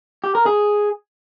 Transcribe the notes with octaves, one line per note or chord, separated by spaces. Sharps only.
G4
A#4
G#4